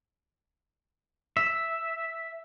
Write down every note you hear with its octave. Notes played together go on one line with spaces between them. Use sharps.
E5